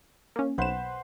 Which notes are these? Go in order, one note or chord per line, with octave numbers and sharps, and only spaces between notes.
A#3 C#4
B1 B4 C5 F#5 E7